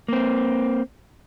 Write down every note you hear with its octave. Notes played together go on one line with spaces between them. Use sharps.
A#3 C4